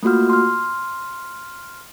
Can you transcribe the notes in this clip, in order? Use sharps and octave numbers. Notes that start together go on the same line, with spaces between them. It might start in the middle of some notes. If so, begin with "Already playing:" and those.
A3 A#3 F4 F#4 F6
C6 F6